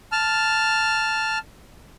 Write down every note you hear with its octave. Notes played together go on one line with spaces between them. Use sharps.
A5 F6